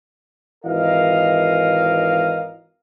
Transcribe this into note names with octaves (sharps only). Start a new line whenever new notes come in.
G#1 E3 A#4 D#5 F5